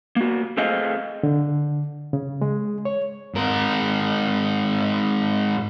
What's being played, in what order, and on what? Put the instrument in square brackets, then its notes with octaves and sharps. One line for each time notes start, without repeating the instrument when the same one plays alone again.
[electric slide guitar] A#3 F#4
A3 C4 G#4 D#5 F5
[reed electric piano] D3
C#3
G#3
C#5
[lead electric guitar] G#2 A#4